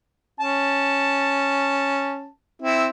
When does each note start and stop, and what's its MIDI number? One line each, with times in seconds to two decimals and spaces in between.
0.40 2.26 61
0.40 2.26 81
2.62 2.87 60
2.62 2.87 64